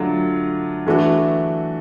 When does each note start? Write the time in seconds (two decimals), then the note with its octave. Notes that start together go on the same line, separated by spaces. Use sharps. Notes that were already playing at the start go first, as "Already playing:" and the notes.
Already playing: D3 F#3 A3 D4 F4
0.87 E3 A3 D4 F#4